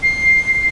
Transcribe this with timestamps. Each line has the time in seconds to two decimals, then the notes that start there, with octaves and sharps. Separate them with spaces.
0.03 C7